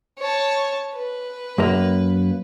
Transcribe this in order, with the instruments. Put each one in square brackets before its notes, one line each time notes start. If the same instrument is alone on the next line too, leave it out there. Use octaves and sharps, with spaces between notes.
[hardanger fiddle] C#5 A5
B4
[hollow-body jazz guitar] F#2 A#3